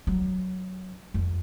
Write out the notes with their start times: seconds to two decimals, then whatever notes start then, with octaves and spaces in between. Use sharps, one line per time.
0.07 F#3
1.14 F2